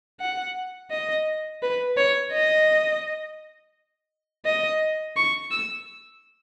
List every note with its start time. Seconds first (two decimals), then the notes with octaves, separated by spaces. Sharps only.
0.20 F#5
0.91 D#5
1.62 B4
1.97 C#5
2.32 D#5
4.45 D#5
5.16 C#6
5.51 E6